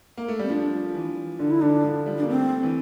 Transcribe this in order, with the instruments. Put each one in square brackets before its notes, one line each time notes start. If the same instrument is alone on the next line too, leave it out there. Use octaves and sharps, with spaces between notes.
[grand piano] A#3
A3
[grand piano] G3 [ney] C4
[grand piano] F3 [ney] D4
[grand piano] E3
[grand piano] D3 [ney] D4
[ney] E4
[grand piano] D3 [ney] D4
[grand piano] F3
G3
[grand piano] A#3 [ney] D4
[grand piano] A3 [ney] C4
[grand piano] E3